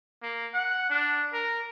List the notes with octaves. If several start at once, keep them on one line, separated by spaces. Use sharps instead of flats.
A#3
F#5
D4
A#4